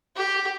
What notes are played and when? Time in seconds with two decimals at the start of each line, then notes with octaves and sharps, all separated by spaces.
0.17 G4